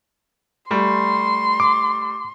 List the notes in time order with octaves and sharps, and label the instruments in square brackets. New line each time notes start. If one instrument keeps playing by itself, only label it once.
[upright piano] G3 A3 [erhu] C6
[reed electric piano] D6